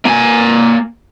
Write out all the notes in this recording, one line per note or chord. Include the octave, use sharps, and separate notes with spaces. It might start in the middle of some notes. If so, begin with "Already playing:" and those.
A#3 G#5